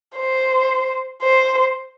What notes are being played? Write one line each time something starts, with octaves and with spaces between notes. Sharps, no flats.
C5
C5